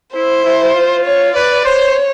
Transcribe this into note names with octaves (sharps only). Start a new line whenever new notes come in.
E4 C5
E4
F4
C#5
B4 D5
C5 C#5